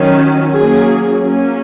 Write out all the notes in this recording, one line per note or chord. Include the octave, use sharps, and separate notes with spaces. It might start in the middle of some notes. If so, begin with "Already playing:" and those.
Already playing: D#3 F#3 C#4
F#3 A#3 C#4 G#4
F#3 A#3 C#4